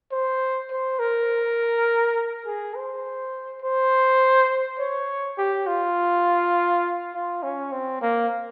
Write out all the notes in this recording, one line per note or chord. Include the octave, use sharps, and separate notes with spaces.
C5
C5
A#4
G#4
C5
C5
C#5
G4
F4
F4
C#4
C4
A#3